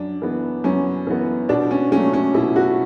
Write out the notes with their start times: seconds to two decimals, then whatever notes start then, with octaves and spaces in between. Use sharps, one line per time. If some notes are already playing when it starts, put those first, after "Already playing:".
Already playing: F#2 D4
0.22 E3 B3
0.64 F#2 C#4
1.07 E3 B3
1.49 B2 D4
1.71 C#4
1.92 F#3 A3 C#4
2.13 C#4
2.34 B2 E4
2.56 F#4